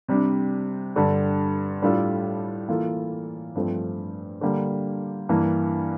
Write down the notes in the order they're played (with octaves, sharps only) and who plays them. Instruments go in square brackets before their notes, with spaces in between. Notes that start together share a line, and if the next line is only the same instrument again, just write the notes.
[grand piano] C3 G3 D4
G2 D3 G3
A2 G3 D4 F4 A4
E3 A#3 F4 A4
G2 F3 A3 C4
D3 G3 A#3
G2 E3 A#3